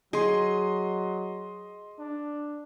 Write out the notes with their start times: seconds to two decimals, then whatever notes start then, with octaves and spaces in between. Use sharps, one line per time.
0.13 F#3 G#4 D#5 C6
1.99 D4